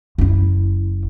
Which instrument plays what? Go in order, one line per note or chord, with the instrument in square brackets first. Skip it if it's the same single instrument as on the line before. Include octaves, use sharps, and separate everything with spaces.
[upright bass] F#1 E4